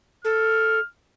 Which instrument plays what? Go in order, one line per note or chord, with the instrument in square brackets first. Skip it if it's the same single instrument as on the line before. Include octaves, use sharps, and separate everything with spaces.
[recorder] A4 [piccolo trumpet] F6